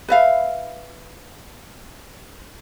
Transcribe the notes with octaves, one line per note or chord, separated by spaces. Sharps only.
B4 E5 F5